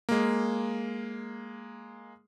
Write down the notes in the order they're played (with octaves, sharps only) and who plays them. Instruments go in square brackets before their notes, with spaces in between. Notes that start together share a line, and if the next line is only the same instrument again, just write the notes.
[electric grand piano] G#3 A#3